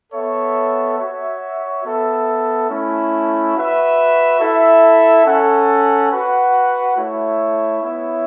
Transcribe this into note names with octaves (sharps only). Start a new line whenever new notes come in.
B3 A4 C#5 E5
F#4 C#5 E5
B3 A4 E5
A3 C#4 E4
F#4 B4 E5
E4 A4 E5
C#4 A4 F#5
F#4 B4 F#5
A3 E4 C#5 E5
B3 E4 C#5 E5